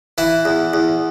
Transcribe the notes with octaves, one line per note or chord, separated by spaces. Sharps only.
E3 E4
E2
E2